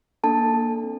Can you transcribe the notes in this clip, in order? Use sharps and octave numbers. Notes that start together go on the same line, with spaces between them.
A#3 D4 A4 A5
D4 A4
C4